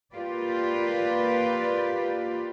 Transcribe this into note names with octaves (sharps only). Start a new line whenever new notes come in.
A#3 F4 G4 B4 D5